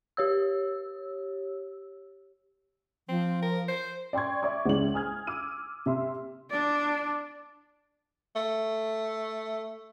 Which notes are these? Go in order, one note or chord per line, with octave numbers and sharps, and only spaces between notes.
G4 C#5 E6
F3 C4
A#4
C5
D5 G5 C6 C#6 G#6
D5 E5 C#6 D6
C#2 C#4 E4 F#7
G#5 D#6 F6 G#6
D6 E6 F6 D#7
C3 E5 C6
D4 D5
A3